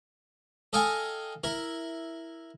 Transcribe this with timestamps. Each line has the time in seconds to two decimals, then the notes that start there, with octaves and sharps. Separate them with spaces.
0.73 A4 D#5 F5 G5 G#5
1.44 E4 A#4